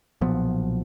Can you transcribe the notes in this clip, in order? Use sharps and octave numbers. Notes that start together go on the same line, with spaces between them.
B1 A#2 F3 B3